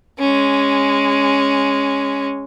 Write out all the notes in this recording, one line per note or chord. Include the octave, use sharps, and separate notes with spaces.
G#3 C#4